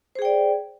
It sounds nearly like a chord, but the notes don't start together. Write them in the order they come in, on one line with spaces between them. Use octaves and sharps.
C5 G#4 G5 D5